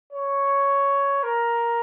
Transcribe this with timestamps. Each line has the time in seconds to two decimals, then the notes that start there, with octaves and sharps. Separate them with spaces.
0.13 C#5
1.23 A#4